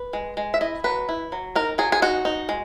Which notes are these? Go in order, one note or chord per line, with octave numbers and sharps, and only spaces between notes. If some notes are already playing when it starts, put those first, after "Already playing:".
Already playing: B4
G#3
G#3
E5
E4 D#5
F#3 B4
E4
F#3
D#4 A#4
F#3 G#4
G#4
D#4 F#4
D#4
G#3